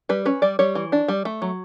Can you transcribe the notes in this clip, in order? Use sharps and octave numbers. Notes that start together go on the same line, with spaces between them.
G3 B4
C#4 B4
G3 D5
G3 C#5
E3
D4
G3
A3
F#3